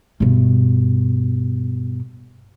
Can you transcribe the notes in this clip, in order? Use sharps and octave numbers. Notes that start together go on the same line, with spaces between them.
G2 B2